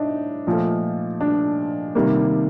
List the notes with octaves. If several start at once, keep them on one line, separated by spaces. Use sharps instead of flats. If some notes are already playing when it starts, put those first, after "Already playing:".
Already playing: A2 D4 D#4
A#2 F3 A3
D4
C3 D#3 G3 A#3